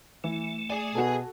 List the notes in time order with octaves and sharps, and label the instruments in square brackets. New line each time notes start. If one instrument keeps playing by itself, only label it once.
[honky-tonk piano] E3 [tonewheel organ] A3
[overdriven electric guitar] G#4 G#5 [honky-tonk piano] D5
[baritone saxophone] B2 [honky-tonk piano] F#4 A4